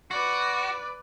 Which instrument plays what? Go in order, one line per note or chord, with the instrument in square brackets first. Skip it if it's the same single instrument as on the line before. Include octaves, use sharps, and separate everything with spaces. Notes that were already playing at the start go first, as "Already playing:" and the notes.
[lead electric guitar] F#4 [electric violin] B4 D5